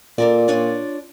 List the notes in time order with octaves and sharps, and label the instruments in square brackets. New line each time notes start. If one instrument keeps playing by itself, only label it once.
[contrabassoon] A#2 [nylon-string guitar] A4 A#4 D5
[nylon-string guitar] D4 F4 C#5